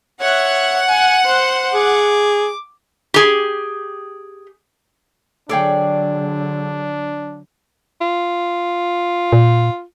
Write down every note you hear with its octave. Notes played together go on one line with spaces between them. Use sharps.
C#5 E5 F#5
G#5
C5
G#4 D6
G4 G#4
D3 F#3 D4 G#4 A4 C#5 D5 G5
F4
A#2